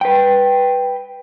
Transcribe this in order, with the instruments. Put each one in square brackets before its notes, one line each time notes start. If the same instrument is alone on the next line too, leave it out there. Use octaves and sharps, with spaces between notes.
[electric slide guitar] B4 G5